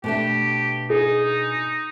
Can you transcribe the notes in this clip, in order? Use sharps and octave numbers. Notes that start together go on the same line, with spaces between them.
B2 A3 D4 G4
D#4 G#4